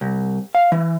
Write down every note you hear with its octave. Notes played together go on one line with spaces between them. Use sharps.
C2
F5
E3